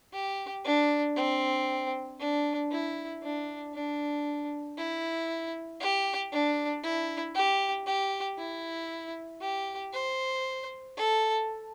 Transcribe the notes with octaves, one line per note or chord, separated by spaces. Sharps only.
G4
D4
C4
D4
E4
D4
D4
E4
G4
D4
E4
G4
G4
E4
G4
C5
A4